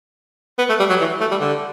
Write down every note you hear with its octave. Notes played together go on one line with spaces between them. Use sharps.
B3
A3
G3
F#3
E3
A3
G3
D3